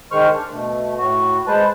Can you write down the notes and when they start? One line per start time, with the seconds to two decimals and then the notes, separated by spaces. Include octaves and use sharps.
0.12 D#3 G#3 C5 C#6 F6
0.34 D4
0.52 B2 A3
0.98 A2 F#4
1.47 G#3 B4 C5 A5